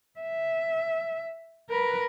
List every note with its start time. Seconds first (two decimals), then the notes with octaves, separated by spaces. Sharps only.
0.20 E5
1.70 A#4 B4